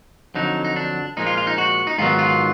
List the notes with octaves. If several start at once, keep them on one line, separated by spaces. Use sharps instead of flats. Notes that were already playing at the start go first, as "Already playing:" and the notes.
F2 D3 F#3 D#4
D#4
D4
A#2 F3 G#3 D#4
F4
F4
D#4
F#4
D#4
G#2 D#3 F#3 B3 F4
F4